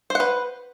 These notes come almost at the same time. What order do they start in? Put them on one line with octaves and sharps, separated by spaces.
C5 F#5 B4